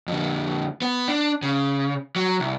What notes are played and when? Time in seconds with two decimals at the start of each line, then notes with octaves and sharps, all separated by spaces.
0.08 F2 D3
0.82 B3 B4
1.08 D4
1.42 C#3
2.16 F#3
2.40 C2